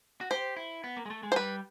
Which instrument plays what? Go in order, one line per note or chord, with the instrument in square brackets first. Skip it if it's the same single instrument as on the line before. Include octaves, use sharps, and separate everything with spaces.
[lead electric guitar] F#4
[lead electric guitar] G4 [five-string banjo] C5
[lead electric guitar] E4
B3
A#3
G#3
A3
G#3
[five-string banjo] C5
[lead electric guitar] G3 [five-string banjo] B4